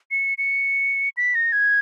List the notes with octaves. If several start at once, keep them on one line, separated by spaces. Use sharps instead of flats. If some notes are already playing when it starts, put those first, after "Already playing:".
C#7
C#7
B6
A#6
G#6